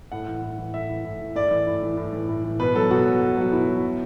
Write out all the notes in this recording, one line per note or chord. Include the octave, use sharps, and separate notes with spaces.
A2 F#5
E3
A2
E3
A2 E5
E3
A2
E3
A2 D5
E3
A2
E3
A2
E3
A2
E3
B2 B4
F#3 A4
B2 F#4
F#3
B2
F#3 F#4
B2 E4
F#3
B2